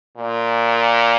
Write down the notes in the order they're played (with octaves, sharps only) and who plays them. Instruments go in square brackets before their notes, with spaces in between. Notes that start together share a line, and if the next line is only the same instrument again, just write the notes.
[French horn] A#2